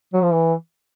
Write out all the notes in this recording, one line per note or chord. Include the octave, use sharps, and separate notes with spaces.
F#3
F3
E3